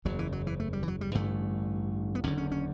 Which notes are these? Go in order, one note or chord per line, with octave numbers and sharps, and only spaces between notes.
F#1 E2 C#3 F#3
E3
F#3
E3
A3
G3
E3
F#3
G3
A1 G2 D3 A3
B3
F#1 E2 D3 C#4
C#4
C#4